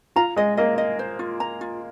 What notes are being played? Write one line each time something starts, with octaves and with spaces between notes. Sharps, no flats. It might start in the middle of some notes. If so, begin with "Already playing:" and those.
F4 A#5
G#3 D#5
A#3 D#5
D#5
C5
F4
A#5
F4